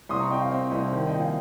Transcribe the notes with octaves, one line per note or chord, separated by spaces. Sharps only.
C2 C6 D#6
A#5 C#6
C3 D#5 G5
F5
C4 D#5
C2 D#5
D#3
D#5 G5
A#1
F5 G#5